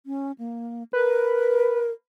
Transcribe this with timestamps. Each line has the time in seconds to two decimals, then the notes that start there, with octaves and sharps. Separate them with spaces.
0.06 C#4
0.38 A#3
0.93 A#4 B4